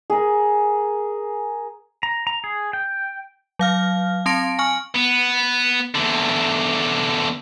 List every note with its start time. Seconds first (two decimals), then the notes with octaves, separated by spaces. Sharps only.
0.10 G#4 A#4
2.03 A#5
2.27 A#5
2.44 G#4
2.73 G5
3.59 F#3 F5 F6
4.26 C4 A5 C6 A#6 D7
4.59 G#5 C#6 F6
4.95 B3
5.95 E2 D3